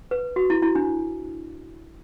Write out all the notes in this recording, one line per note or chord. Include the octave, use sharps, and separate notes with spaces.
B4
F#4
E4
E4
D4